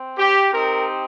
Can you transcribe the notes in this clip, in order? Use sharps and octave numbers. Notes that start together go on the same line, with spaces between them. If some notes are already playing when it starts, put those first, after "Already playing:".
Already playing: C4
G4
C4 D#4 G4 A#4